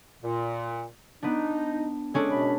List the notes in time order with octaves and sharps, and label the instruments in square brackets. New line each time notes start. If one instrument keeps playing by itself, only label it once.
[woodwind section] A#2
[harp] B3 D4 [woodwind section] D#4
[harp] G#3 C#4 D4 [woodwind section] A4
[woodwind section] F#2 B2 B5